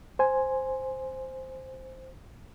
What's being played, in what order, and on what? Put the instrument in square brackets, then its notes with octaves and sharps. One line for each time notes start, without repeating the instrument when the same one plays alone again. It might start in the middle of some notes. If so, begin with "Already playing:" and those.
[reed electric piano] C5 G#5